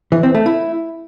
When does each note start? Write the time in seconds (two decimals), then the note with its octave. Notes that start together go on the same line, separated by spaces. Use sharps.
0.12 E3
0.23 C4
0.35 A3
0.46 E4